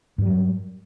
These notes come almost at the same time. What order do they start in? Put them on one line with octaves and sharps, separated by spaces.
G2 G3 F#3